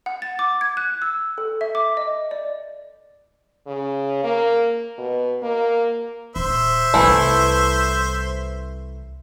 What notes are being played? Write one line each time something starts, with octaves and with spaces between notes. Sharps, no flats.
F#5
A6
D6
G#6
F#6
E6
A4
E5
D6
D#5
D5
C#3
A#3
B2
A#3
D#1 C5 E5
C2 E3 G3 A3 E4